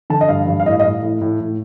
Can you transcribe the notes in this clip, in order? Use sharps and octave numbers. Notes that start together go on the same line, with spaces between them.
D3 A5
D#5
G2 F5
G2
F5
A2 D#5
D#5
A2 F5
A2
A2
A2